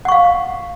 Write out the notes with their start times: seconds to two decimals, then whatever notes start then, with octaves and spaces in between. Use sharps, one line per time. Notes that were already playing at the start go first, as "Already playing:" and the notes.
0.05 F#5
0.08 C#6
0.12 F5